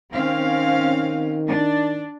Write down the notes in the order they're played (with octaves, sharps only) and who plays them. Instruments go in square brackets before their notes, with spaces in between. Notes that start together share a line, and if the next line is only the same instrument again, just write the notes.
[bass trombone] D#3 [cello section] C4 C#4 F5
[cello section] D4